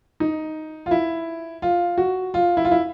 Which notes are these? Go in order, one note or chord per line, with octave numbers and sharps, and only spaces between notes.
D#4
F4
E4
F4
F#4
F4
E4
F4
E4